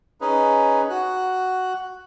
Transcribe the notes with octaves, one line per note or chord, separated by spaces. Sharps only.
C#4 D#4 G#4 B4
F#4 F#6